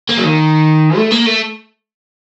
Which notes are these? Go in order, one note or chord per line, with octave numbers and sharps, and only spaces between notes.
A#3
F#3
D#3
A3
A#3
A3